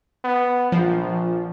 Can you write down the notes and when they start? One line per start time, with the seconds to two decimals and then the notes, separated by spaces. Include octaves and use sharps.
0.25 B3
0.72 A#1 F3